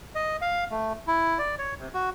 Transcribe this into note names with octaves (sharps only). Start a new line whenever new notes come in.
D#5
F5
A3
E4
D5
C#5
C3
F#4